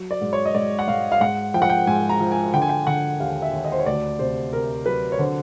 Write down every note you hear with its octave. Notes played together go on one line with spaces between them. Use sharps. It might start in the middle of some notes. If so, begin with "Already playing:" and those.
Already playing: F#3
D5
G#2
C#5
D#5
G#2 D5
F#5
G#2 F5
F5
G#2 F#5
F3 G5
F#5
G5
G#2 G#5
A#5
F3
G#5
D3 G5
G#5
G5
D3 F#5
D#2 F5
E5
D#2
D#5
C5
C#5
D2 D5
C3 C5
C3 A#4
F#3 B4
C#5
D3 C5